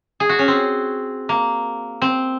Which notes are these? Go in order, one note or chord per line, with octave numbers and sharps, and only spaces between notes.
G#4
F#4
C#4
C4
A#3
C4